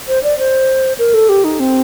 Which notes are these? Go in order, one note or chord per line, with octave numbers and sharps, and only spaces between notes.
C5
D5
C5
A#4
A4
G4
D#4
C4